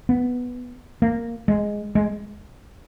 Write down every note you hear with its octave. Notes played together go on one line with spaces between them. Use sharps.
B3
A#3
G#3
G#3